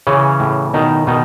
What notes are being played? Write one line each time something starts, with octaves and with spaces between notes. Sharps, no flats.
C#3 E3 C#4
A2
B2 D#3 D#4
B2 D#3 D#4